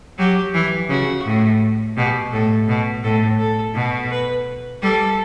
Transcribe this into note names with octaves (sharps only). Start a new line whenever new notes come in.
F#3 G4
E3
C#3 F#4
A2
B2 G4
A2 A4
B2
A2 A4
A4
B2
B4
G3 A4